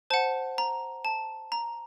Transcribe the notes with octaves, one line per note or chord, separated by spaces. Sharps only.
C5 F#5 A5
A#5
A5
A#5